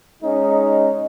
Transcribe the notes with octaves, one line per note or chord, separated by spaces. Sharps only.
G#3 C#4 D#4